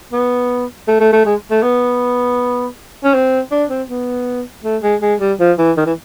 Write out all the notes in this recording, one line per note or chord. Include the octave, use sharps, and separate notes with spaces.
B3
A3
A3
A3
G#3
A3
B3
C#4
C4
D4
C4
B3
A3
G#3
G#3
G3
F3
E3
D#3
E3